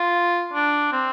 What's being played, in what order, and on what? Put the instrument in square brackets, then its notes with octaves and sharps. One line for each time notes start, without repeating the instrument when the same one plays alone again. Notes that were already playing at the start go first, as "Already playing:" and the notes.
Already playing: [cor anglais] F4
D4
C4